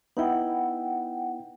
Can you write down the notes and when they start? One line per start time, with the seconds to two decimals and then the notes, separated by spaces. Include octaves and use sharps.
0.17 B3 D#4 E4 F#5 G5